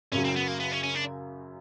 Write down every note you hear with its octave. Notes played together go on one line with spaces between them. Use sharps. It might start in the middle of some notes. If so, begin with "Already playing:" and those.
F#2 C#3 F#3 C#4
C4
B3
A#3
B3
C#4
C#4
D4